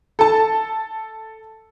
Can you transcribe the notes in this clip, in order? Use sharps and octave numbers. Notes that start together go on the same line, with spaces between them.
A4 A5